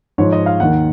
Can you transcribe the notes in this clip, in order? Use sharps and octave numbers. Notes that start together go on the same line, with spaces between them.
G#2 F3 C#5
D#5
F5
D#2 D#3 F#5